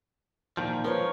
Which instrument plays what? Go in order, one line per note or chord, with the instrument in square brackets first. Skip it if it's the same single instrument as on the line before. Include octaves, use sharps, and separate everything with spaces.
[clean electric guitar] A#2 D#3 F3
[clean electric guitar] F3 [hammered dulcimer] A#4 B4 C#5